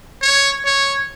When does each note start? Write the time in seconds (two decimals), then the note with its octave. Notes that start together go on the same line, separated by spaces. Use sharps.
0.22 C#5
0.65 C#5